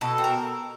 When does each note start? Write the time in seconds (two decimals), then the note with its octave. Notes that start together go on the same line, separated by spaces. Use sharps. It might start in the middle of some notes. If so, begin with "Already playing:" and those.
0.01 B2 A4
0.18 C4
0.24 A#4